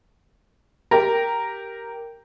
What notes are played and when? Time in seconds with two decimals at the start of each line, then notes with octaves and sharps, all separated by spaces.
0.91 G4 A#4